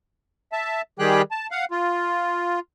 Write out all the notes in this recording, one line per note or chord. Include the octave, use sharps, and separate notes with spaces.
E5 A5
D#3 G3 G4 G#4 G5 F#6
A5
F5 F#5
F4